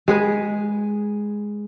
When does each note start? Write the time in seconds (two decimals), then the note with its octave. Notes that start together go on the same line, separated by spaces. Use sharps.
0.08 G#3 G#4 B4